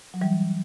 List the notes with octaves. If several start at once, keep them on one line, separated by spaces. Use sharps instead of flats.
F#3
E3 G3